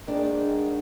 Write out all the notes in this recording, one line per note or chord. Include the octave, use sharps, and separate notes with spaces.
G#2 D#3 D4